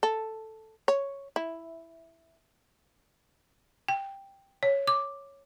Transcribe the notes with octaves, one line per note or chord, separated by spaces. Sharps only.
A4
C#5
E4
G5
C#5
D6